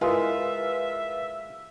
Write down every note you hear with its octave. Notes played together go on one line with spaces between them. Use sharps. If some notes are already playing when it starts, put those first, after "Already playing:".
G#3 E4 F4 A#4 B4 E5